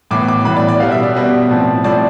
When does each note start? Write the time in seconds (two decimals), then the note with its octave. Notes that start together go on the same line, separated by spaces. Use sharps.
0.11 A2 E3 B3 D6
0.28 D6
0.45 A2 E3 B3 B5
0.57 D5
0.68 D5
0.80 B2 G3 B3 F5
0.92 E5
1.03 D5
1.15 B2 G3 B3
1.50 A2 F3 C4
1.84 A2 F3 C4 D5